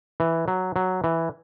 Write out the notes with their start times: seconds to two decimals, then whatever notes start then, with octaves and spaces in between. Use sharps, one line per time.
0.20 E3
0.48 F#3
0.76 F#3
1.04 E3